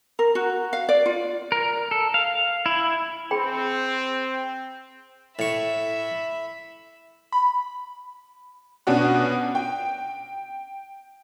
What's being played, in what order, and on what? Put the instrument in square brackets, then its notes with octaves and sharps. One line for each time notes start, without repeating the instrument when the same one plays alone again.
[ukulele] A#4
F#4
F5
D5
F4
[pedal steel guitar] A#4
A4
F5
E4
[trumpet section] C4 [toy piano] G#4 G5 B5
[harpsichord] A2 C#6 [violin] E5 B5
[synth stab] B5
[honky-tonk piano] B2 C#4 D4 F#4
G5